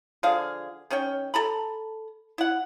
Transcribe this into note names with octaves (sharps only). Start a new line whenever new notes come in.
D3 F3 G#4 F5
D#3 C#4 C#5 G5
A4 A#5 B5
E4 F#5